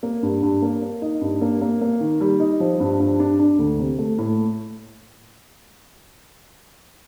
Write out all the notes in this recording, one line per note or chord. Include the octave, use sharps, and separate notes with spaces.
A#3
G2
G2
A#3
A#3
D#4
G2
A#3
A#3
A#3
D#3
G3
D#4
F3
G2
G2
D4
D4
D2
C3
A3
A2